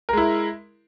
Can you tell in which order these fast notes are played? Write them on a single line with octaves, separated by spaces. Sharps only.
A#4 G#3 E4